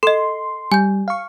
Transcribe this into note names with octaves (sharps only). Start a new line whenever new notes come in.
A4 D#5 C6
G3 G#5 G6
F5 C#6